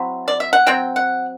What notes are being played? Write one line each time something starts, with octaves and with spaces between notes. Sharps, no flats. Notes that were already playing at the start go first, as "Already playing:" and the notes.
Already playing: F#3 C4 E4
D5
E5
F#5
F#3 C4 G5
F#5